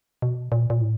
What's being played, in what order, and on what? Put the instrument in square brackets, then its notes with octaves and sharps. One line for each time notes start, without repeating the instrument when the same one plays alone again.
[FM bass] B2
A#2
A#2
A2